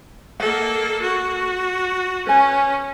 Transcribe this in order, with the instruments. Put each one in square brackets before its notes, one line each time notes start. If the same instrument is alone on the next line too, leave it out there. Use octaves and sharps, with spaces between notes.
[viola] A#3 A4 [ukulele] D#5 F#5
[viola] F#4
[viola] C#4 [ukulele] B4 G#5